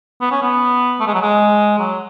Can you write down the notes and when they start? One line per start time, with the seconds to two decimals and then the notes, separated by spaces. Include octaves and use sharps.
0.21 B3
0.31 C#4
0.42 B3
1.00 A3
1.07 G#3
1.14 F#3
1.21 G#3
1.79 F#3